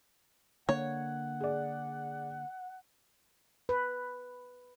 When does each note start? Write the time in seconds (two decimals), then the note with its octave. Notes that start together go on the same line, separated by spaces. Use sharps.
0.69 D3 A#3 C#5 F#5
1.41 G#4 D5
3.69 B4